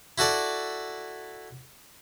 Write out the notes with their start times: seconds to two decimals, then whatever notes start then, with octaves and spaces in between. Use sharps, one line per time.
0.18 E4 F#4 A4 D5